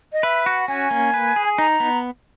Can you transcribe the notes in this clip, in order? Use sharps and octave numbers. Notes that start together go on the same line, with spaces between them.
D#5
B4 E5
F#4 F#5
C#4 G#5
A#3
B4
G#4
D#4 A#5
B3